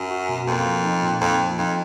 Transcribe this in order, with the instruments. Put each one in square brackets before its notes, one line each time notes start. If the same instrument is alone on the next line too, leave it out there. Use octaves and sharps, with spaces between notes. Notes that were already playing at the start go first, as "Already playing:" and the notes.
Already playing: [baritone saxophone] F#2
[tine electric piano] F#4
B2
[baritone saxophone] F2 [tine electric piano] A#3
[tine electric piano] F3
D#4
A#2
[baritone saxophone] F2 [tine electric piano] A#3
[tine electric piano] F3
[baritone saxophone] F2 [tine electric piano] D#4